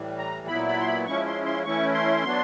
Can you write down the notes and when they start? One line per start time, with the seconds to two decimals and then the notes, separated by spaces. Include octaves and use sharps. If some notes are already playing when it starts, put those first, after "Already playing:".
Already playing: A2 E3 G3
0.18 A#5
0.47 A#2 F#3 B3 E4 B5
0.68 B5
0.81 C6
0.87 B5
1.06 F3 G#3 C#4 E4 C#6
1.26 C6
1.45 C6
1.65 E3 A3 C#4 E4 C#6
1.94 C6
2.24 F#3 B3 D4